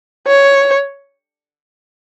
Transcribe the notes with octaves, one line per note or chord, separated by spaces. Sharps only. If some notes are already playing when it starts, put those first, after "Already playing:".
C#5